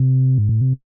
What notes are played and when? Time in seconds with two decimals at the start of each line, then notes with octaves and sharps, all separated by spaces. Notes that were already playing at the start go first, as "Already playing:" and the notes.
Already playing: C3
0.38 G#2
0.49 A2
0.61 C3